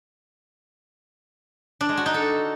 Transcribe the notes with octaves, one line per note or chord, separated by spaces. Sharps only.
D4
G#3
F#4
D#4
A4